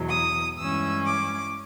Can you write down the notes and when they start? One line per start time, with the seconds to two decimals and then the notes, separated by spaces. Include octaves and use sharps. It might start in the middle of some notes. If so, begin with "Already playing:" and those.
Already playing: E2 B2 F#3
0.09 D#6
0.57 G2 E3 G#3 C#4 E6
1.07 D6